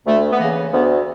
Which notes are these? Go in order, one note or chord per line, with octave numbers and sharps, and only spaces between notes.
D2 A3
B3
C#3 E3 A#3
D2 B3